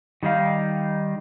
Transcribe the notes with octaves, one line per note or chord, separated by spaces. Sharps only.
D#3 G3 D#4 F5